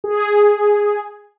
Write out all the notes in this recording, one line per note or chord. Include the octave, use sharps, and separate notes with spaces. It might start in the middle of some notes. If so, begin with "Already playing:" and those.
G#4